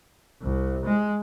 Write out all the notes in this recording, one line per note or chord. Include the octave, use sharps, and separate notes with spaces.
C2
G#3